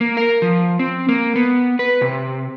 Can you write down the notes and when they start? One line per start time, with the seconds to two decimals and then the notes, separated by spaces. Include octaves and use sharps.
0.01 A#3
0.17 A#4
0.42 F3
0.79 C4
1.09 A#3
1.36 B3
1.79 B4
2.01 C3